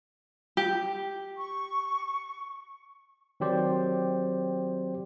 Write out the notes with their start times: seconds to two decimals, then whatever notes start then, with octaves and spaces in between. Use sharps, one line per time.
0.57 G4
1.37 C#6
3.40 D#3 F#3 C4 G4 C5 D5